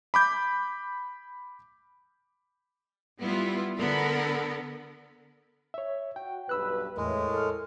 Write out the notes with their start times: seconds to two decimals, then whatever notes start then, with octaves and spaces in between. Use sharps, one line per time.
0.14 B5 D6 G6
3.21 G3 B3 E4 F4
3.78 D3 B3 A4 A#4
5.74 C#5 E5
6.16 F#4 G5
6.49 B1 G2 B4 B5 E6 F#6
6.97 E2 A2 G#3 A#4
7.34 A4 F6